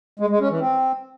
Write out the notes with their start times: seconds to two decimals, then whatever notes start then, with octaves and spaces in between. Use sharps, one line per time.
0.20 G#3
0.30 G#3
0.40 C#4
0.50 E3
0.61 C4